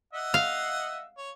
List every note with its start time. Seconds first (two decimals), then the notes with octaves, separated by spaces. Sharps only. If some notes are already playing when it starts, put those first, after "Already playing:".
0.13 D#5 E5 F#5
0.34 F5
1.18 C#5